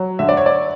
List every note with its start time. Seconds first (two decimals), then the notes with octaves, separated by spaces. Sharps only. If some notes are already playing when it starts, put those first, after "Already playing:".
Already playing: F#3
0.19 D3 E5
0.29 D5
0.37 C#5
0.46 D5